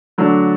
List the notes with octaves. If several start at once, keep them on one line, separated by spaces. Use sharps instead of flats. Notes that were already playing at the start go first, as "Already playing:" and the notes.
D3 F#3 A3 D4 A4